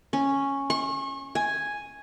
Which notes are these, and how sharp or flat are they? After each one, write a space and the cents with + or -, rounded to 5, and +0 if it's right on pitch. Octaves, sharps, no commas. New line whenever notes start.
C#4 -5
C#6 -35
G#5 +0